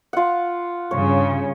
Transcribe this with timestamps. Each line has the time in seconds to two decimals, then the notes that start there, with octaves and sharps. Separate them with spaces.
0.13 F4 F#5
0.91 G2 C#3 C#5